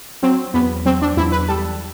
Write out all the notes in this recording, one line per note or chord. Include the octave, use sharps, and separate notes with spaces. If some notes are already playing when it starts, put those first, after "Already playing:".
F#3 C4
E2 B3
F#3 C4
D4
E2 E4
B4
G3 A4